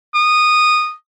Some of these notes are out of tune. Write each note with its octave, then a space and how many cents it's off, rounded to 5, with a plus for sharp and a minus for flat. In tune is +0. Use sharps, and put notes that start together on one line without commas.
D#6 -15